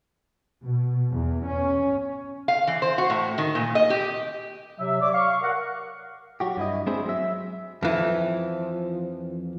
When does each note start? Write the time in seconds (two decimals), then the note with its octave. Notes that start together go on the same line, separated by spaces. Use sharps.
0.63 B2
1.11 E2
1.47 C#4
2.48 F5
2.67 E3
2.82 C5
2.98 F#4
3.10 A2
3.38 D#3
3.55 A#2
3.75 D#5
3.90 G4
4.78 C3 F#3 E5
5.00 C#5 D5 E5 D6
5.12 F5 C#6
5.42 A#4 F#5
6.40 F#3 F#4 G4
6.57 G2 E4 D#5
6.87 G#3 C4 D4 E4 G#4 C5
7.06 F#3 E5
7.83 F2 E3 F3